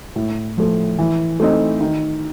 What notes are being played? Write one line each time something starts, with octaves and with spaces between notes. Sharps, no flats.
A2
F3 A3
E3
A3 C4 D#4
D#3